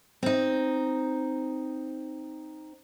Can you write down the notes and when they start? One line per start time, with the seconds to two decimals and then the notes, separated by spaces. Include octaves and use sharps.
0.23 C4 D#4